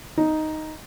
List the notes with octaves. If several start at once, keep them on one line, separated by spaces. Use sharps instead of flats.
D#4